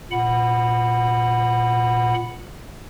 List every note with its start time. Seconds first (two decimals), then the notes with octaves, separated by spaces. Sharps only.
0.11 A#2 F#5 B5